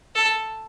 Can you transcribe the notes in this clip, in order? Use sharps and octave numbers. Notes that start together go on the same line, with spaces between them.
A4